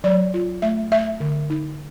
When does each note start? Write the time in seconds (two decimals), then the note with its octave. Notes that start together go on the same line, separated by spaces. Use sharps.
0.04 F#3 D5
0.34 F4
0.62 A3 E5
0.91 A3 E5
1.20 D3
1.50 D#4